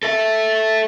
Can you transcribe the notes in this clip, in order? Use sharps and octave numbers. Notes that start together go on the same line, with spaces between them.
A4 E5